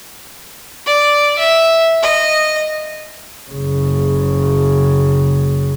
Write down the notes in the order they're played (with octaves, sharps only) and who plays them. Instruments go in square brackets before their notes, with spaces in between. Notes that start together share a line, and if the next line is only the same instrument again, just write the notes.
[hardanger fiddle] D5
E5
D#5
[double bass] F#1 C#3